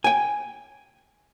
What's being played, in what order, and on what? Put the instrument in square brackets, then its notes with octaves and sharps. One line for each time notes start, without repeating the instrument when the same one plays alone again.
[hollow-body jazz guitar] G5 G#5